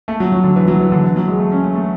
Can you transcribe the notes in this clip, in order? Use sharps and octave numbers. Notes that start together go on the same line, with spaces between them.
A3
F#3
F#3
D3
E3
F#3
E3
D3
E3
F#3
G#3
A3
C#4
A3
A3